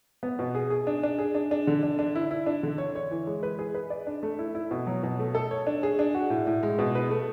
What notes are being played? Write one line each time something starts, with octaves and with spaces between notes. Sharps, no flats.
B3
B2
G#4
G#4
D4
D4
G#4
D4
D4
D3
D4
D4
E4
E4
D4
D3
C#5
C#5
E3
G#3
B4
G#4
B4
D5
D4
A3
E4
E4
B2
F#3
B2
A3
A4
C#5
D4
G#4
D4
F#4
A2
A2
G#3
B2
B4
A3